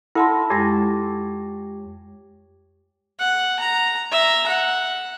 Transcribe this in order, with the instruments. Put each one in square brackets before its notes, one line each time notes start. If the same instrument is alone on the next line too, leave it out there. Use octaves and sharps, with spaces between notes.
[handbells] E4 A4 [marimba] F#5 A5 C6
[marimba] F2 G#3 A#6 [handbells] G4 C#5
[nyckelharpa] F#5
A#5
E5 A#5
F#5